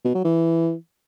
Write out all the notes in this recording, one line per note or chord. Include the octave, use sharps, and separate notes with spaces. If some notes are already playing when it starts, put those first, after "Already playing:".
B2
F#3
E3